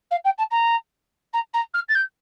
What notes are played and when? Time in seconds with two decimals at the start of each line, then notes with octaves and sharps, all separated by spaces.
0.10 F5
0.24 G5
0.37 A5
0.50 A#5
1.33 A#5
1.53 A#5
1.73 F6
1.88 A6
1.94 G6